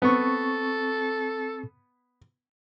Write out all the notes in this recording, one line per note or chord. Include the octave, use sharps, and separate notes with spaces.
B3 C4 A4 C#6